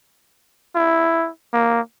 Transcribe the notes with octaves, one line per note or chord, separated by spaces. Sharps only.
E4
A#3